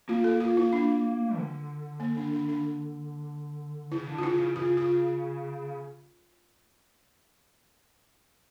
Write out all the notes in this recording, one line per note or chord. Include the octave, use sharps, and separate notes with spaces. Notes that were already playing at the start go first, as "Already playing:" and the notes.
A#3 F4
A4
F4
E4
D4
D3
A#3
D4
D4
D4
C#3 E4
D3
F4
C#3 E4
C#3
C#3 F4
F4